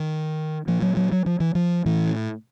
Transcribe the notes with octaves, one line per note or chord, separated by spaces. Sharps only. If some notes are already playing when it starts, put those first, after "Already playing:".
Already playing: D#3
A#2 F3
F#3
F#3
F#3
F3
E3
F3
A2 E3